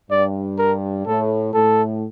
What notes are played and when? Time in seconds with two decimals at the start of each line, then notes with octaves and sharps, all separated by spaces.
0.11 G2 D5
0.59 A#4
1.06 A2 A4
1.54 A2 A4